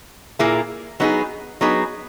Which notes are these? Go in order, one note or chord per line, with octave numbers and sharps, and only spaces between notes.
A#2 A#3 E4 G#4
F#3 B3 D#4 G#4
F#3 B3 D#4 G#4